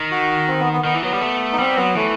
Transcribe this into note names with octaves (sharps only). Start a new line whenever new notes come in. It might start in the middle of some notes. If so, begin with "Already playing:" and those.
Already playing: D#3
F#4
C4
B3
B3
D#3 B3
E3
F#3 B3
G3
A3
D#4
G3 C4
F#3 B3
E3 A3